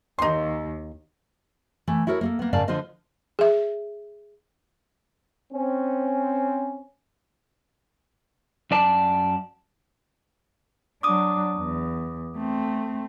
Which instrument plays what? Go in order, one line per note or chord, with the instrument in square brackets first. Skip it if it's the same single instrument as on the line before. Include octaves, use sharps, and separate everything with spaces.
[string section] D#2 [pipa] D#4 C6
[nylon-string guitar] E3 A3
E4 F#4 A4 A#4 C5 C#5
A#3 G#4 A4
A#3 B3
G#2 C#3 A#4 D5 F5 A5
D3 F3 F4 C5 D#5
[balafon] G#4 E5
[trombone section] C4 C#4
[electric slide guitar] F#2 D5 A5
[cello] F#3 D4 [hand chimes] D6 D#6
[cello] E2
A3 C4